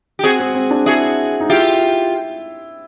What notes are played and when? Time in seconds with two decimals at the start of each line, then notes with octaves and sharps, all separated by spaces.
0.19 G4
0.23 C4 F#4 G#4
0.40 C4
0.55 C4
0.71 D4
0.86 E4 F#4 G#4
1.41 D#4
1.50 E4 F4 G4